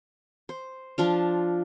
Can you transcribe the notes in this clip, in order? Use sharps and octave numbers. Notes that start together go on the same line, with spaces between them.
C5
F3 D4 F4